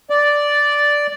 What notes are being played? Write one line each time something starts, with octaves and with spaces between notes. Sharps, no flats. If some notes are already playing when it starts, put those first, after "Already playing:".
D5